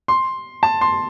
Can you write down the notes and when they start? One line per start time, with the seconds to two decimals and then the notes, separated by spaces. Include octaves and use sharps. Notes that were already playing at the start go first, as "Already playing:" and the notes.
0.08 C6
0.63 A5
0.81 C6